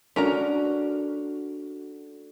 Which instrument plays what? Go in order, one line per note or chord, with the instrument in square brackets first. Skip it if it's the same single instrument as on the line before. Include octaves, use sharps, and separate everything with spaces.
[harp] A3 D4 F#4 [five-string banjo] C#4 A#4 A#5